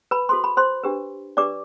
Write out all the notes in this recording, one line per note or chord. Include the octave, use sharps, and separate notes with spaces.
B4 B5
F#4 A4 C5 C6
B5
C5 C6
D4 G4 B4
D4 G4 B4 D5 D6